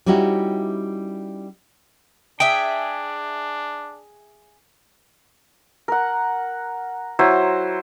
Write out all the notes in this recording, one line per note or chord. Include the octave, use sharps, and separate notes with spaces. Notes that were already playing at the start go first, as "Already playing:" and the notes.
G3 C#4 D#4 E4 F#4 G4
D4 G#4 E5 G5
A#4 F#5
F#3 E4 C5